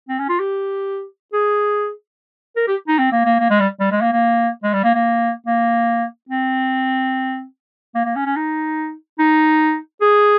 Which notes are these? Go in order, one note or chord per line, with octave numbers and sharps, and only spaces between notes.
C4
C#4
F4
G4
G#4
A#4
G4
D#4
C4
A#3
A#3
A#3
G#3
G3
G3
G#3
A#3
A#3
G#3
G3
A#3
A#3
A#3
C4
A#3
A#3
C#4
C#4
D#4
D#4
G#4